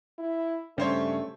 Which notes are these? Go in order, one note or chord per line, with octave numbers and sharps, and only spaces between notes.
E4
G2 C#3 G3 A3 C#4 C5 C#5